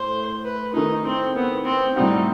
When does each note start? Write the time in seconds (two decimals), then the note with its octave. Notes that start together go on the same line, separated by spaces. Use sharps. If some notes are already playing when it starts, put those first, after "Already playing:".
Already playing: A2 A3 C5
0.44 B4
0.74 D#3 A3 D#4 E4
1.05 C4
1.36 B3
1.65 C4
1.96 A2 G3 C4 D#4 F#4